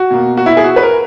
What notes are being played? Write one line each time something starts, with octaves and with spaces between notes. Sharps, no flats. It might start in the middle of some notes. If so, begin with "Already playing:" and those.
Already playing: F#4
B2 A#3
F#4
E4
G#4
F#4
B4
A#4